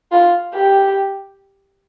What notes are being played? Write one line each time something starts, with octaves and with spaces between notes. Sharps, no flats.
F4
G4